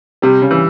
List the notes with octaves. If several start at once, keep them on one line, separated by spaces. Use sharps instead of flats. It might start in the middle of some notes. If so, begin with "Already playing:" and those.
C3 G3
C#3
E3